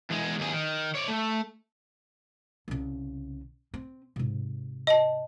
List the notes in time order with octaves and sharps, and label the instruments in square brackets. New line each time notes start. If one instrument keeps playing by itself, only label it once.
[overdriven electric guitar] E2 G#3
D#2 G#4
D#3
C#5 D5
A3
[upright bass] C2 C#3
C4
G#2 C3
[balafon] D#5 A5